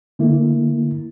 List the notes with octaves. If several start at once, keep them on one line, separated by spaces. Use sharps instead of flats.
D3 A3 A#3 E4